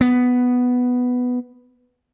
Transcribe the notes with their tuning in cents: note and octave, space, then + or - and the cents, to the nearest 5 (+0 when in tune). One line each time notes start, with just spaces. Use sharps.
B3 +5